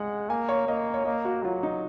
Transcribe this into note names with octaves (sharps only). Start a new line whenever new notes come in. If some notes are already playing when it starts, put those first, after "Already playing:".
Already playing: G#3 F#5
A#3 G#5
C#5
A#3 D#5
C#5
A#3 D#5
F#4
F#3 F4
D#4